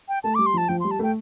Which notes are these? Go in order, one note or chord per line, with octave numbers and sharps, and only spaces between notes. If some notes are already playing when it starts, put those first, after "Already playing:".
G5
A3 A5
D6
G3
C6
F3 A5
F3 G5
C6
G3
A5
A3 G5